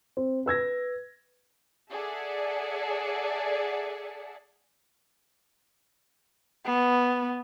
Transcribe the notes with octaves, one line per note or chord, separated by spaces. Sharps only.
C4
B4 E6 G#6 A#6
G#4 A4 D5 E5 F#5
B3